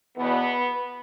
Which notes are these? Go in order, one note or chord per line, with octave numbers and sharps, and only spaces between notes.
E2 B2 B3